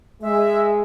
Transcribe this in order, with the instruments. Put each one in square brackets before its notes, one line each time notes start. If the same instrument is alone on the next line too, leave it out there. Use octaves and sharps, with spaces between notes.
[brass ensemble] G#3 [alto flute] E5